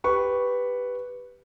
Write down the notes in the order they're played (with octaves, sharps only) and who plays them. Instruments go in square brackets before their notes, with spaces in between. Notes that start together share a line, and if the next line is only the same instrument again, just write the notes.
[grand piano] G4 B4 C#6